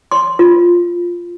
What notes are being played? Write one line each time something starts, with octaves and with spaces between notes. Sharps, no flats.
C6
F4